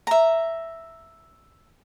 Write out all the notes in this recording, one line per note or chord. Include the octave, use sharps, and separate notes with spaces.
E5 A#5